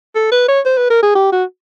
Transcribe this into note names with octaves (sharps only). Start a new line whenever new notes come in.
A4
B4
C#5
C5
B4
A#4
G#4
G4
F#4